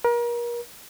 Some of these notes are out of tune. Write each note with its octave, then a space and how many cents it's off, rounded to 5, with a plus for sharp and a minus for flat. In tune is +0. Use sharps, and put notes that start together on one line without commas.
A#4 +35